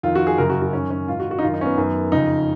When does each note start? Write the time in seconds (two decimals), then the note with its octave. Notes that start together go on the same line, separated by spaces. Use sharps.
0.03 F2 D#3 F4
0.15 F#4
0.27 G#4
0.38 F#2 C#3 A#4
0.50 F#4
0.62 F#4
0.73 F#2 D#3 C#4
0.90 C#4
1.08 G#2 F4
1.12 D#3
1.20 F#4
1.31 F#4
1.39 D#4
1.42 F#2 D#3 F4
1.54 D#4
1.61 C#4
1.66 B3
1.77 F#2 D#3
2.12 F2 C#3 D#4